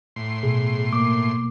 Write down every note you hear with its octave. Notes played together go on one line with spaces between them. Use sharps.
A2 C6
B2 G#4
A#3 D6